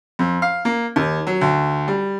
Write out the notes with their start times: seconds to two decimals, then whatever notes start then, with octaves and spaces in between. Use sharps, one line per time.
0.19 F2
0.42 F5
0.65 A#3
0.96 D#2
1.27 F#3
1.41 D2
1.88 G3